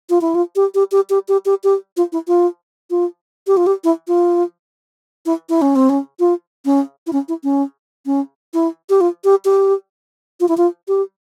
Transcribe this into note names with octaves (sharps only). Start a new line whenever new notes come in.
F4
E4
F4
G4
G4
G4
G4
G4
G4
G4
F4
E4
F4
F4
G4
F4
G4
E4
F4
E4
E4
C#4
C4
C#4
F4
C#4
E4
C#4
E4
C#4
C#4
E4
G4
F4
G4
G4
F4
E4
F4
G4